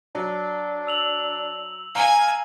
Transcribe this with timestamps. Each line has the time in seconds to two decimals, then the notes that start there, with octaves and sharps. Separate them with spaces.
0.15 F#3 D4
0.87 E6 F7 F#7
1.95 F5 G#5 A#5